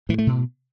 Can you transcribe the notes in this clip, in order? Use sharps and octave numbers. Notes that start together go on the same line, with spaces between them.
A2 E3
A3
B2